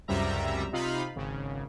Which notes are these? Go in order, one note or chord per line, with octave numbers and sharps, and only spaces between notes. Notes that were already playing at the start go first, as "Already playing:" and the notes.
C#2 F#2 C3 G3 E5 A#5
C3 D#4 F4 F5 B5
G#1 C#3